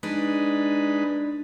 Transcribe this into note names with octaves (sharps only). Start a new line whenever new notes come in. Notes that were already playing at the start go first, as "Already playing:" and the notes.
G#3 D4 D#4 B4